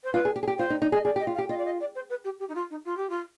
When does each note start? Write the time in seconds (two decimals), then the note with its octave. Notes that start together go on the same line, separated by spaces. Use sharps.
0.04 C5
0.14 F4 B4
0.25 G#4
0.36 G4
0.43 G#4
0.48 G4
0.58 F4 C5
0.70 D#4
0.82 D#4
0.92 G#4 D#5
1.04 G#4 D5
1.16 G4
1.20 D#5
1.27 F4
1.34 F5
1.38 G4
1.49 F4 D#5
1.58 D5
1.65 D#5
1.80 D5
1.95 C5
2.10 B4
2.24 G4
2.40 G4
2.49 D#4
2.55 F4
2.71 D#4
2.85 F4
2.97 G4
3.10 F4